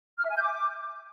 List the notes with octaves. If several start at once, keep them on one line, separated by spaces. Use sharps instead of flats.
F6
E5
G#5
G6
D6